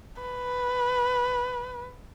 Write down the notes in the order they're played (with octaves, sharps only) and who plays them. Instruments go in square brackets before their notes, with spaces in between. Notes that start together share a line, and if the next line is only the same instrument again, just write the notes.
[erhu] B4